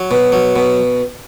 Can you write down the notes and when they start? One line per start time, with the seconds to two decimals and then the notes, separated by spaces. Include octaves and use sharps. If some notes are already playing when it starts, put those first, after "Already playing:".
Already playing: F#3
0.11 B2
0.32 F#3
0.56 B2